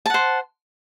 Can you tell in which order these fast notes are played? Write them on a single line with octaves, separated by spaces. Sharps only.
A5 F#5 C5